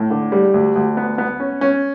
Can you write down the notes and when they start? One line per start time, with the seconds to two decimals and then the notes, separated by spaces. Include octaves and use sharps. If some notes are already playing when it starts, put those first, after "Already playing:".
Already playing: A2
0.10 D3
0.32 G3
0.54 D2
0.76 D2
0.97 B3
1.18 B3
1.40 C#4
1.61 C#4